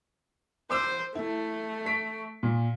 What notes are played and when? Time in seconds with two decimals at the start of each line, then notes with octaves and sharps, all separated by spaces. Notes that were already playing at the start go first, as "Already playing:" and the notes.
0.70 C5 C6 D6 E6
1.15 A3 E4
1.85 C#6 B6 D7
2.43 A#2